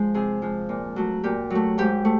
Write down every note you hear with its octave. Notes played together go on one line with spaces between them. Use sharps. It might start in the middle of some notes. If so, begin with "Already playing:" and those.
Already playing: F3 G#3
C3 G#4
F3 G#3
A#2
F#3 A3
A#2 G4
F#3 A3
G#2 G4
A3